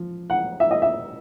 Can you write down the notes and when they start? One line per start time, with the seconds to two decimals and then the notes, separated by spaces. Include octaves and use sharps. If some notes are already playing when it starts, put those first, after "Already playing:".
Already playing: F3
0.30 F#5
0.60 E5
0.71 D#5
0.82 E5